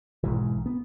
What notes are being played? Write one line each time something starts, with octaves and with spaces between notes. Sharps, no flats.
B1 G#2 E3
B3